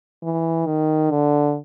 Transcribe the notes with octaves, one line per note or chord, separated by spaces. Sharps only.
E3
D#3
D3